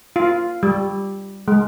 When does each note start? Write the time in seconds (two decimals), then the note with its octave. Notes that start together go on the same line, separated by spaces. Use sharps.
0.16 F4
0.63 G3
1.48 G#3